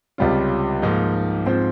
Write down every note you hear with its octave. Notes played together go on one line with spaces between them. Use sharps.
C#2 C3 G3 C#4 F4
G#2 F3 A#3 D#4
G#2 F3 C4 F4 C5